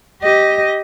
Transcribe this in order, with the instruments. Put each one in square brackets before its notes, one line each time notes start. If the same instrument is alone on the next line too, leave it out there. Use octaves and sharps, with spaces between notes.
[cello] G4 D#5